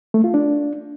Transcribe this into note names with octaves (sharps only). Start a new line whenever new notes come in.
A3
F4
D4